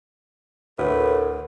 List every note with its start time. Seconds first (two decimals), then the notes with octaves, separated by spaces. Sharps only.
0.79 D2 A2 A#4 B4